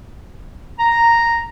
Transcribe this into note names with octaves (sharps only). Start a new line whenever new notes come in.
A#5